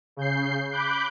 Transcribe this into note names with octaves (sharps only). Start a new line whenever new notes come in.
C#3 G6 C7
B5 D6 F#6 G6